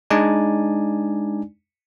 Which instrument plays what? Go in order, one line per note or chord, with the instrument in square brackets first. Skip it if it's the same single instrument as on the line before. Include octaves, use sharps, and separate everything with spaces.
[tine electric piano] G#3 D4 D#4 D5 G#5